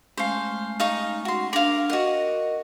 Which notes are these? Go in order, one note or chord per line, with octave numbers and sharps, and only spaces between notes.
G#3 A3 C#4 C5 F5
D#4 F5 C#6
F#4 C6
D4 A#4 F5
F#4 A#4 D#5 F#5